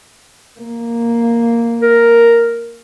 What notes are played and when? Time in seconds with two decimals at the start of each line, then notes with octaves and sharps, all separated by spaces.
0.60 A#3
1.82 A#4